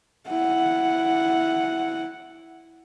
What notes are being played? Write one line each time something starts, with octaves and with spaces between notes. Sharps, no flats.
E4 F#5